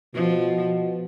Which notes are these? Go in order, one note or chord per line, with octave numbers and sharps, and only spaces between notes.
B2 F3